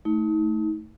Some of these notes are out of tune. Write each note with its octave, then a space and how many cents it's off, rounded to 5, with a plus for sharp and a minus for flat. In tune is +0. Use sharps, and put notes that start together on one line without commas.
A3 +0 D#4 +35